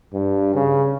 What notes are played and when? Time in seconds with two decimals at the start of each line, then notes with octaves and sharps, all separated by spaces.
0.13 G2
0.54 C#3